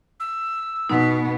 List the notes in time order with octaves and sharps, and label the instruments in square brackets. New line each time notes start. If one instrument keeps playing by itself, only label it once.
[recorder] E6
[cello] B2 B3 [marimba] D#4